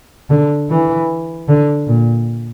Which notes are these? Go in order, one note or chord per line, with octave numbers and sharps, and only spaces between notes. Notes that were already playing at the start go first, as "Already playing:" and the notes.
D3
E3
D3
A#2